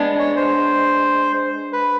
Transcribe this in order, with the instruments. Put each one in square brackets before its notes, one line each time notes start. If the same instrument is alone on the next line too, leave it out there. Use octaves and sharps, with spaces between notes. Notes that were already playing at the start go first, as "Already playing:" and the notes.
Already playing: [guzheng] G#3 B3 D4
[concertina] C#5
C5
B4